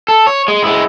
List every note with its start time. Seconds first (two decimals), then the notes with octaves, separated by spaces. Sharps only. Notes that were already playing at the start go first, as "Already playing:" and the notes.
0.08 A4
0.27 C#5
0.48 G#3
0.63 G#3 E4